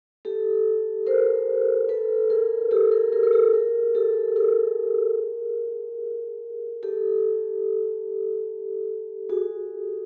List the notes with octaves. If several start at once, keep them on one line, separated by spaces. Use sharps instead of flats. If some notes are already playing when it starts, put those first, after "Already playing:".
G4 A4
A#4 C5
A4 B4
G#4 A#4
G4 A4
G#4 A#4
G#4 A#4
A#4
G4 A4
G#4 A#4
G4 A4
G#4 A#4
G4 A4
F#4 G#4